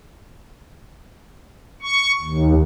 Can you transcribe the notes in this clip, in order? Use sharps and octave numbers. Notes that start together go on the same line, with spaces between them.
C#6
D#2